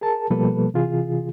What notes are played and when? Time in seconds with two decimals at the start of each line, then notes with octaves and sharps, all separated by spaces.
0.01 G#4 A#4 A5
0.30 B2 F3 G3 A#3 A4 B4
0.74 C3 E3 F4 G#4